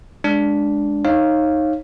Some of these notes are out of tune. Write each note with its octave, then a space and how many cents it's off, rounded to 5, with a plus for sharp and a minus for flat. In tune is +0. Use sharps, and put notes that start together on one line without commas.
G#3 +0 D4 -5
D#4 +0 C#5 -30 F5 +0